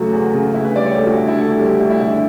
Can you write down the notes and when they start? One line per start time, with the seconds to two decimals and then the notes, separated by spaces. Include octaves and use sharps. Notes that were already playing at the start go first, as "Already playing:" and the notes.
Already playing: E2 C#3 F#3 A3 F#4
0.12 E2
0.33 C#3
0.54 D2 E4
0.64 B4
0.75 G3 D5
0.86 C#5
0.91 G4
0.96 D2 A4
1.06 F#4
1.17 D3 E4
1.28 E4
1.38 D2 A4
1.52 A4
1.59 G3
1.66 G4
1.80 D2 E4
1.90 E4
2.01 D3 E4
2.12 E4